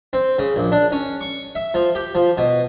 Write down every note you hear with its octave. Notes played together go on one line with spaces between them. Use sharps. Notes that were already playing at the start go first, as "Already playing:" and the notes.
C4
C#3
A#1
D4
C#4
C#6
E5
F3
G4
F3
B2